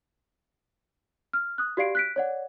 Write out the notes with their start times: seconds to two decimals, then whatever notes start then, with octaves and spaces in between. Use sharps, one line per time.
1.33 F6
1.58 D#6 F#6
1.77 F#4 G4 D5 F5 C7 D7
1.95 F#6 B6 D7
2.16 C#5 D5 F#5